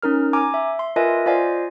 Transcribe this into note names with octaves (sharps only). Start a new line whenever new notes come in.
C#4 D#4 A#4 F6
G#5 A#5 D6
E5
C6
F4 A#4 B4 D#5 E5 G#5
F4 C5 D5 D#5 F5 G#5